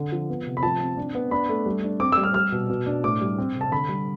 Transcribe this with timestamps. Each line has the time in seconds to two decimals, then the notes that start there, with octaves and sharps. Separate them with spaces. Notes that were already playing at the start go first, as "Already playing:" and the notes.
Already playing: D3
0.12 F3
0.29 B3
0.46 C3
0.57 B5
0.63 F3 A5
0.80 C4
0.97 D4
1.15 B3
1.31 D4 B5
1.49 A3
1.66 G3
1.84 D4
2.00 C4 D6
2.12 E6
2.17 G3
2.23 F6
2.34 G3 F6
2.52 B2
2.69 B2
2.86 D4
3.04 A2 D6
3.21 G3
3.38 C4
3.55 C3
3.61 A5
3.72 D3 B5
3.89 G3